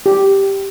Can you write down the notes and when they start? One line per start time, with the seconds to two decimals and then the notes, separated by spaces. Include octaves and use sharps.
0.06 G4